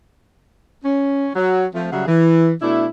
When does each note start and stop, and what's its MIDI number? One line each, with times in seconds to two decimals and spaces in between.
0.85 1.28 61
1.35 1.65 54
1.74 1.91 53
1.74 1.91 57
1.74 1.91 60
1.92 2.03 49
1.92 2.03 54
1.92 2.03 55
1.92 2.03 68
1.92 2.03 76
1.92 2.03 78
2.07 2.52 52
2.62 2.86 47
2.62 2.86 57
2.62 2.86 62
2.62 2.86 64